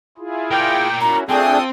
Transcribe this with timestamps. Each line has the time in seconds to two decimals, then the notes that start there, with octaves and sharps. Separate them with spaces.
0.18 E4 F4 G#4
0.51 A#4 D5 G5
1.01 C#4 E4 F#4 A#5
1.29 A3 C4 D4 F4 G#4 A4 G5 D#6